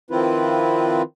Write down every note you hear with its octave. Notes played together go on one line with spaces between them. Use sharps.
D#3 F3 C4 E4 F4 B4